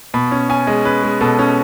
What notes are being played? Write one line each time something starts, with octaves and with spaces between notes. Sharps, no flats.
B2 B5
C#4
C#4 G#5
G#3
C#4 B4
G#3
B2 A4
C#4